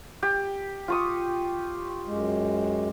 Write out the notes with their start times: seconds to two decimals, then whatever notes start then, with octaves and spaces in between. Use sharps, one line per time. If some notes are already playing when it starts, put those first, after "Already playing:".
0.23 G4
0.88 F4 C#6 D#6
2.06 F#2 G#3